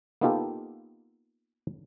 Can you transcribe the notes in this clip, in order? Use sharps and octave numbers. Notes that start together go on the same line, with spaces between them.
A#3 B3 D#4 F4 G4 A4